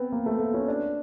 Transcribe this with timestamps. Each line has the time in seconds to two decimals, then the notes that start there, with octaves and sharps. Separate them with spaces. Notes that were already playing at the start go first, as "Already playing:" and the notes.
Already playing: B3 C4
0.12 A#3
0.26 A3
0.40 A#3
0.54 C#4
0.68 D4